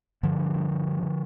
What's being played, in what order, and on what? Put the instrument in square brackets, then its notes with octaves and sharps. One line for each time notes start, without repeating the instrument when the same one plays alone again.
[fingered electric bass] G2 D3 F3
G2
G2
G2
G2
D3